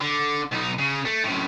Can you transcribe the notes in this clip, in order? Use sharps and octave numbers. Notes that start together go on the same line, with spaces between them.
D3
B1 D#4
C#3
A3
F#2 A2